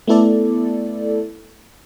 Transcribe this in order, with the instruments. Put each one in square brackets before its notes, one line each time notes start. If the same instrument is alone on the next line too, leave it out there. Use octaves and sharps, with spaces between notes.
[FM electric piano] A3 B3 E4 A4 D5